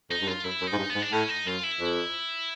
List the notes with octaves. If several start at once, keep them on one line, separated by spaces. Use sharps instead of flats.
F2 D#4
G2
F#2 F4
F#2 E4
F#2
D#4
G#2
G2
B3
G#2
D4
A2 C#4
D#4
F#2 F4
E4
F2